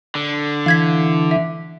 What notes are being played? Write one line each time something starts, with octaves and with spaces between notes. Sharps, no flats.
D3
E3 F5 G#6 B6
E5